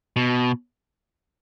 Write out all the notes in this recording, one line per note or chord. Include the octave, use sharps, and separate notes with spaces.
B2